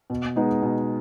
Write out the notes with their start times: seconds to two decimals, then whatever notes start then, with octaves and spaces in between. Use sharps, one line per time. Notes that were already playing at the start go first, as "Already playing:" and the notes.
0.10 B2
0.36 G#3 B3 D#4
0.62 B2